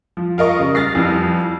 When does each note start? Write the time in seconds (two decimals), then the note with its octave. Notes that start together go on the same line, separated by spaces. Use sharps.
0.17 F3
0.38 F4 A#4 D#5 C#6
0.59 C#3 G3
0.75 F6 A6 A#6 C7
0.95 F2 E3 G3